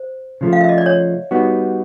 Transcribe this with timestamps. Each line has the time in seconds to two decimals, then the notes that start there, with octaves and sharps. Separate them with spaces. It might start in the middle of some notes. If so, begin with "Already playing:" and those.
Already playing: C5
0.41 C#3 F3 A3
0.53 F5
0.61 E5
0.69 D#5
0.78 D5
0.86 C#5
1.31 G3 B3 D#4 F#4